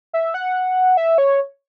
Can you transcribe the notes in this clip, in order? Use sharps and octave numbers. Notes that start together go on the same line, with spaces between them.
E5
F#5
E5
C#5